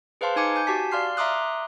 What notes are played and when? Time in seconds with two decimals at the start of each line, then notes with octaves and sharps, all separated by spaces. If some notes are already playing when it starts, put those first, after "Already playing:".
0.21 G#4 B4 C5 F5 A5 C6
0.36 D#4 G#5 D6 C#7
0.56 G#5 G6
0.67 F#4 G4 A5 B6
0.91 D5 F5 C6 F6 C7
1.17 E5 A#5 C6 D6 D#6 F#6